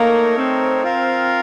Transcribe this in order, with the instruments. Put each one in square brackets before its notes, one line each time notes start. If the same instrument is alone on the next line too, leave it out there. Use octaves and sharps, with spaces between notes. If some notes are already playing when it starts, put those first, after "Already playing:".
Already playing: [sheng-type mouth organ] A3 D#4 A#4 C#5 [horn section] A#3
[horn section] C4
[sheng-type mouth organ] F4 A#4 F5